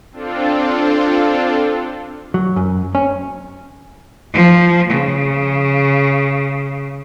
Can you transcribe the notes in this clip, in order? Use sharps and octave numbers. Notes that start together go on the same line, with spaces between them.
C4 D4 F4 A4
F#3
F#2
C#4
F3
C#3